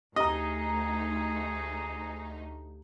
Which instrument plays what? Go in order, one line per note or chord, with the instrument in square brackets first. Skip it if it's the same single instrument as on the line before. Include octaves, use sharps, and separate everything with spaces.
[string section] D2 D#4 [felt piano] G4 A#5 [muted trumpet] G#4 [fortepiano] D#5